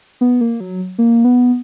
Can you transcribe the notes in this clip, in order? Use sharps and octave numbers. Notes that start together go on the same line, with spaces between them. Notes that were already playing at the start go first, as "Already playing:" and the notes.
B3
A#3
F#3
A#3
B3